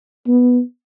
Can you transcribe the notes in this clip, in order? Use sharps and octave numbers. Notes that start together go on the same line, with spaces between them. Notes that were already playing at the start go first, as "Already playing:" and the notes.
B3